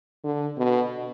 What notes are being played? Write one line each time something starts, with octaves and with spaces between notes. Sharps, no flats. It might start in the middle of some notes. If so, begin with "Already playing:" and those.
D3
B2